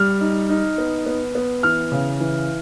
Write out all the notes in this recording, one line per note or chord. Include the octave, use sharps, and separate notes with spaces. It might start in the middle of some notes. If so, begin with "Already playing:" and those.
Already playing: G3 F6
D#4
D#4
B3
B3
B3
E3 F6
C#3
E3